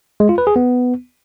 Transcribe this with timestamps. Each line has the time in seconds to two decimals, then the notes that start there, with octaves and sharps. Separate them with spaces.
0.20 G#3
0.29 F4
0.38 B4
0.47 G#4
0.56 B3